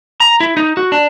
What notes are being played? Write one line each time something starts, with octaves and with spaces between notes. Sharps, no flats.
A#5
E4
D#4
F#4
D4